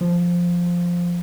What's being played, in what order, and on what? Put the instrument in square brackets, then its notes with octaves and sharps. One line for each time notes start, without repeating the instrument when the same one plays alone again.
[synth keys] F3